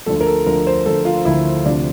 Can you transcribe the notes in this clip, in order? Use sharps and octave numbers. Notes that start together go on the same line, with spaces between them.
D2 D3 F3 A4
A#4
A4
D2 D3 F3 A#4
C5
D2 D3 F3 A4
F4
D2 D3 F3 E4
D2 C3 F3 D4